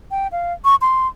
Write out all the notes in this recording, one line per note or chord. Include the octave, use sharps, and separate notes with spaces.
G5
F5
C#6
C6